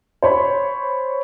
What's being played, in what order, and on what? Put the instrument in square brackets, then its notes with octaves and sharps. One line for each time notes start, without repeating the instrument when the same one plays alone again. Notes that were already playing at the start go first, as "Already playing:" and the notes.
[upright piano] C5 C#5 B5